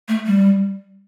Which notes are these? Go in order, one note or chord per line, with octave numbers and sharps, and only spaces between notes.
A3
G3